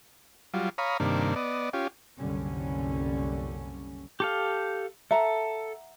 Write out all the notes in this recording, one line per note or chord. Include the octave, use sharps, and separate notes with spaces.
F#3 G3 F4
C#5 F5 A#5 B5 D#6
G2 C3 D#3 A#3 D4
B3 D5 D#5
C#4 F4 G4
F#1 C2 D3 G3 C#4
G4 A4 F5
A4 E5 F#5 A#5